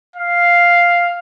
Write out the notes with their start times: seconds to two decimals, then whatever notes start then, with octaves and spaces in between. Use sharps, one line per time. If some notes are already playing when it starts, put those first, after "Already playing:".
0.16 F5